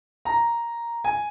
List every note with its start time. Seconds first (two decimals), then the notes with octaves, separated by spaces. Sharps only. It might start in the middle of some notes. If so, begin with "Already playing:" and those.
0.25 A#5
1.05 G#5